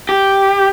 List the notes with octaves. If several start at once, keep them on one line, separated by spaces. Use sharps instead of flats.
G4